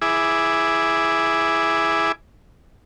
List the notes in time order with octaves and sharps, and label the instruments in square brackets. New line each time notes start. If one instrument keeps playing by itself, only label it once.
[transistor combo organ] E4 G#4 E5 G#5 D6